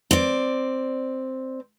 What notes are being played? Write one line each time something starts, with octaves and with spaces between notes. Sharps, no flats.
C4 D5